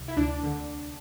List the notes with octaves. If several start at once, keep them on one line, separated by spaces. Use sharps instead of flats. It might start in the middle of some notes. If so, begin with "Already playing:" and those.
Already playing: C2
E4
D2 D4
D3